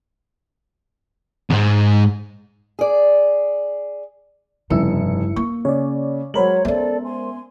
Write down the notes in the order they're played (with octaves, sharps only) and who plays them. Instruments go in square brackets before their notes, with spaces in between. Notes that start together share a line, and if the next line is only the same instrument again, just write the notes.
[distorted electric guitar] E2 G#2
[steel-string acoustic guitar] G#4 D5
[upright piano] F1 E6 [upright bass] G2 [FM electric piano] C#3 E4 C#7
[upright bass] A#3 [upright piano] C#6
[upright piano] C#3 [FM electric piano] C#5 D5
[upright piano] F#3 B5 F#7 [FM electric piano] G#3 A#4 C5 [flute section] C#5
[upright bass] B3 C#4 [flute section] A4 D5 [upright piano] E5
[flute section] G#5 C6